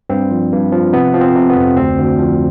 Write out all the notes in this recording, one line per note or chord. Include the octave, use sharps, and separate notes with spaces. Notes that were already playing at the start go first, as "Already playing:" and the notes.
G2 C4
F3
G2
F3
C3 B3
F3
C4
C3
B3
F2
D2 C4
D2
F3